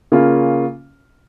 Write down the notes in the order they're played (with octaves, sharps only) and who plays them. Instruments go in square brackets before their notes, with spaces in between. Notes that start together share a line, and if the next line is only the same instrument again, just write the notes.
[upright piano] C#3 A#3 C#4 F4